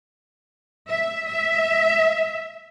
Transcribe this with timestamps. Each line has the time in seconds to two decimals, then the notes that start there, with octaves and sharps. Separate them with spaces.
0.90 E5
1.27 E5